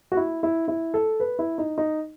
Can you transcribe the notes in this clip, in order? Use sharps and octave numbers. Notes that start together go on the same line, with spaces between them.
F#4
E4
E4
E4
A4
B4
E4
D#4
D#4